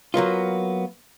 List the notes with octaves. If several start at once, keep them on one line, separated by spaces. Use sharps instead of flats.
F#3 A#3 B3 F4